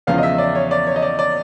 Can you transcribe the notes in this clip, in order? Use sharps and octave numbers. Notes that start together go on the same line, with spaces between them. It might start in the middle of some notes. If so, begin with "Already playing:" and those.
E2 C#3 F3 G#3 B3 F5
D#5
E5
D5
C#5
D5
C#5
D#5
D5
D5